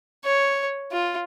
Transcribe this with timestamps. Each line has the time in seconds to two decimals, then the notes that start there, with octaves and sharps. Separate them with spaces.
0.25 C#5
0.92 F4